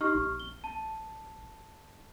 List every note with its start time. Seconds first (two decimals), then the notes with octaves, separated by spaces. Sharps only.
0.01 D#4 G4 C#6 F6
0.15 A#1
0.40 G7
0.64 A5